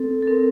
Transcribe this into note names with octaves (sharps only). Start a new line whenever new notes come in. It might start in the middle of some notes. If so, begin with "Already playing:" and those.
Already playing: C4 A4
A4
C4 A#4